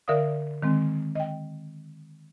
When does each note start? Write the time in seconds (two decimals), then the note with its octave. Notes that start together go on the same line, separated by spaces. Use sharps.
0.08 D3 A#4 D5 E5 F5 D#6
0.62 D#3 G#3 C4
1.15 D#5 G5